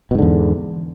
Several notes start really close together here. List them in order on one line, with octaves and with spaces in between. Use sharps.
B2 G#2 D3 E2